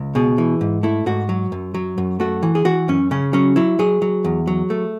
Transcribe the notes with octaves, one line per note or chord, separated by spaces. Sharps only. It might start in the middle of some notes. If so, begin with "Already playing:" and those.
Already playing: C#2
B2 G#4
E3
G#2
A3 E4
G#2 F#4
F#3
F#2
F#3
F#2
A3 F#4
E3
G#4
E3 F#4
F#2 C#4
C#3 C#4
F#3 C#4
F#3 E4
F#3 G#4
F#3
E2
F#3
A3